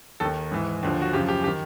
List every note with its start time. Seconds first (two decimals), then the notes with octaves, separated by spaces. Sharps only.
0.20 D#2 D#3 A4
0.51 G#2 E3
0.83 D#2 D3 F3
1.02 F#4
1.13 F#2 C#3 F3 G4
1.28 G4
1.44 G4
1.48 D#3